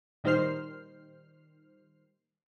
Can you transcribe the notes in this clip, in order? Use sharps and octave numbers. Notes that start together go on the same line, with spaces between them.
A#2 D#3 G3 C5 F6 C7